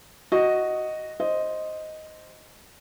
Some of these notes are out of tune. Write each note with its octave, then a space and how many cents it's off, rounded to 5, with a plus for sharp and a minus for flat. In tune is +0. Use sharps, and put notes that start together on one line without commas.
F#4 +0 D#5 +0
C5 +0 D#5 +0